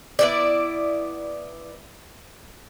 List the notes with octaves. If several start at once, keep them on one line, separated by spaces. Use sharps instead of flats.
B3 E4 D5